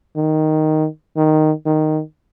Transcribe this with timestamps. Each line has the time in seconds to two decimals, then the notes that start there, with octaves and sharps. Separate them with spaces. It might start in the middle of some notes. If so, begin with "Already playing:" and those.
0.16 D#3
1.17 D#3
1.66 D#3